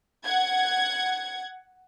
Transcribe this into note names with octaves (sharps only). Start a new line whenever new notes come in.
F#5 G#6